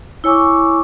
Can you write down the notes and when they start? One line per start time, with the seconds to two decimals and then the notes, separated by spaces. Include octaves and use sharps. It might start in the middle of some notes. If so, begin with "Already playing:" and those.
0.24 E4 C#5 G#5 C#6 D6